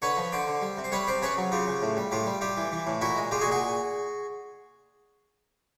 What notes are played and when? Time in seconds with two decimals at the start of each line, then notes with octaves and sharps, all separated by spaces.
0.02 D3 B4 C#5
0.17 F3
0.32 D3 C5 D5
0.47 D3
0.62 G3
0.78 C3
0.84 C5
0.92 G3 B4 C#5
1.07 C3 C5 D5
1.22 C#3 B4 C#5
1.37 F#3
1.52 C#3 F4 G4
1.67 C#3
1.82 A2
1.97 G3
2.11 A2 F4 G4
2.26 G3
2.41 G3 F4 G4
2.57 E3
2.72 E3
2.87 A2
3.01 A#2 E4 F#4
3.16 G#3
3.31 G#3 F4 G4
3.41 F#4 G#4
3.46 A#2
3.51 F#4 G#4